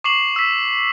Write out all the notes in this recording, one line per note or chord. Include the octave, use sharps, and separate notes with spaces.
C#6 D6 C7 E7 F#7
E6 B6